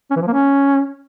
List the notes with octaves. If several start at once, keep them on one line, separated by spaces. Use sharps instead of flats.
C#4
E3
F3
A#3
C#4